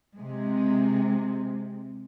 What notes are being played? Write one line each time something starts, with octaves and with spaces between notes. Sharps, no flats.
C3 G#3